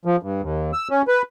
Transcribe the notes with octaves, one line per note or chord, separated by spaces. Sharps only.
F3
G2
D#2
E6
C#4
B4